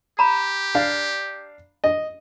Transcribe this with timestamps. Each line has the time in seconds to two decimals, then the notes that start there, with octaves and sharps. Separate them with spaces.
0.19 G4 A#5 B5
0.75 D4 F5
1.84 D#5